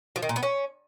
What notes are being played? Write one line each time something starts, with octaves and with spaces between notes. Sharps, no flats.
F3
D#3
A#2
B3
C#4